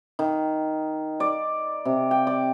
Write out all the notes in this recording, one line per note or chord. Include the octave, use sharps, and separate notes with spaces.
D#3
D5
C3
G5
D5